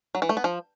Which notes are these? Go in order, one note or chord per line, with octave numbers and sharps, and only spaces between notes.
F#3
E3
A3
B3
F3